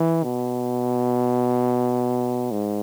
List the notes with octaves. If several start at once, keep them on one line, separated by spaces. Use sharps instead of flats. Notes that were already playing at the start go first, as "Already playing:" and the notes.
Already playing: E3
B2
G#2